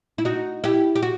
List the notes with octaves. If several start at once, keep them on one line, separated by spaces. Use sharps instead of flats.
E4
D#4 F#4
E4 G4
G4
F#4